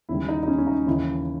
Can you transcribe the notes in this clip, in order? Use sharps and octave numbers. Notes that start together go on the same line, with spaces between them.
D#2 C#3 G3 E4
D#4
D#4
C#4
C#4
D#4
D#2 C#3 E3 E4